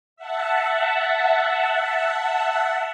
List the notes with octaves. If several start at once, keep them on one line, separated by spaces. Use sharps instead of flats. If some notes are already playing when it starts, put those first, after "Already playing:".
E5 F#5 A5